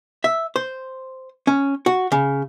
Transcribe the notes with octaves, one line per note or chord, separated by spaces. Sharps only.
E5
C5
C#4
F#4
C#3